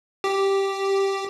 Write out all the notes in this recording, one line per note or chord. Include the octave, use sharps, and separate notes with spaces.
G4